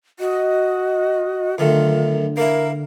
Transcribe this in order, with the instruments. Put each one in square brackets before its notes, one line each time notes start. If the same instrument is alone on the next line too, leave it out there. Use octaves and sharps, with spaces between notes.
[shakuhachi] F#4 [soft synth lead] D#5
[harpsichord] F#2 D#3 A3 [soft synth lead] D3 [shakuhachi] F4
[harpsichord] A#3 E4 [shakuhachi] A#4